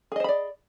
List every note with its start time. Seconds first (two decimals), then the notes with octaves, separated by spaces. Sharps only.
0.12 G#4
0.16 D#5
0.20 C5
0.24 B5
0.29 D5